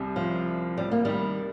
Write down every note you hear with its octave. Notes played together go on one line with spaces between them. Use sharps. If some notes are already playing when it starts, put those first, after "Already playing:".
Already playing: C2 C3 G3
F3
G3
A#3
D#3 G3